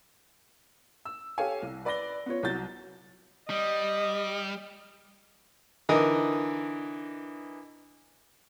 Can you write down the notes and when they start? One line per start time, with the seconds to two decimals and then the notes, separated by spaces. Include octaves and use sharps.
1.05 E6
1.38 G4 A4 C#5 F5 G#5
1.62 C2
1.85 B4 D5 B5 A#6 G7
2.26 B3 F4 C#5
2.43 C2 F#3 G6 A6
3.50 G3 D#5
5.89 D3 E3 D#4 A#4 D#6